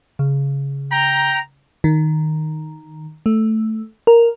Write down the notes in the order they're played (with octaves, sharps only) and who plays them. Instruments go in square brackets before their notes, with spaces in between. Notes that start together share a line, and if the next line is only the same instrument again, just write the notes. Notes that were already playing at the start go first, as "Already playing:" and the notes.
[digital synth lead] C#3
[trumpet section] G5 A#5
[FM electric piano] D#3
A3
A#4